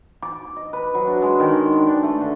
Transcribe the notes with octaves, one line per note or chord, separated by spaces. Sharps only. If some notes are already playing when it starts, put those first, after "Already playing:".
D6
D#5
B4
F#3
D4
G#3
D#3
D4
D4
A3
D3